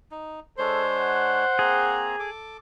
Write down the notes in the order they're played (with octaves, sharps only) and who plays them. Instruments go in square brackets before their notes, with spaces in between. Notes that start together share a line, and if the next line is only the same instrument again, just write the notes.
[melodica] D#4
[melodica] G#3 D4 C#5 [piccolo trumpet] A4 [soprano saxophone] C5
[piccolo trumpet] F#5
[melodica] A#3 C4 A#5 [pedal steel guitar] G#4
[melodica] A4 D6